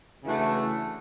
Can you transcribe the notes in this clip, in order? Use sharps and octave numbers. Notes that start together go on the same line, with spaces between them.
C#3 E3 A3 D4 F#4